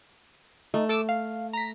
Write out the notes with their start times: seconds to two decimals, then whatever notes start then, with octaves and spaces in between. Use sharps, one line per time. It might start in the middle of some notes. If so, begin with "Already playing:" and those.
0.74 A3 D#4
0.89 A4 D6 E6
1.09 F5
1.53 A#5 A#6 B6